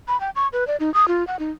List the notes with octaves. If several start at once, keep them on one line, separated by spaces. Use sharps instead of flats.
B5
G5
C#6
B4
D5
D#4
D#6
F4
F#5
D#4